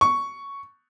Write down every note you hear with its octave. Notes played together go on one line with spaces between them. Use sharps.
C#6